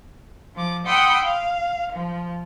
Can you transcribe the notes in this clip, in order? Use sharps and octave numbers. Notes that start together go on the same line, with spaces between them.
F3 D6
F#5 G5 B5 C6 D#6 E6
F5
F3